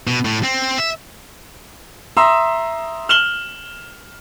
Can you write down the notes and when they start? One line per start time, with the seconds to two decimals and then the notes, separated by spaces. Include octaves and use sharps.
0.07 B2
0.25 A2
0.43 C4
0.78 E5
2.17 E5 A#5 C6 D#6 E6
3.09 F6 E7 F#7 G7